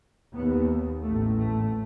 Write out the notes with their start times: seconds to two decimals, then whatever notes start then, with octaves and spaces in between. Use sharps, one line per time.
0.34 D#2 B3
1.02 A1 A2 A3
1.37 A3